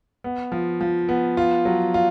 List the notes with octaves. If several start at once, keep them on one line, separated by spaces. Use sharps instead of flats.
B3
F3
F3
B3
F4
F#3
F4